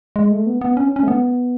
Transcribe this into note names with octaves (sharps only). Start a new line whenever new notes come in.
G#3
A3
B3
B3
C#4
C#4
A3
B3